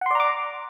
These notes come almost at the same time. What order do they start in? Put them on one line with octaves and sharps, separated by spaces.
F#5 C6 D5 A#5 D6